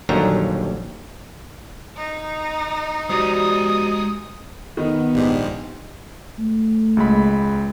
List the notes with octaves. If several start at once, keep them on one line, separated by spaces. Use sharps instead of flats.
A#1 D#2 D3 F#3 G3 A#5
D#4
G#3 F#4 G4 C5 D5 D#6
D#3 B3
A#1 G#2 G#3 D4 G4
A3
C#2 G#3 B5